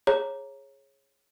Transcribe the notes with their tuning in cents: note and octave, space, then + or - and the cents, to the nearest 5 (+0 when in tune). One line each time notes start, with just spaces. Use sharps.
G#4 +0 C#5 -25 A#5 +0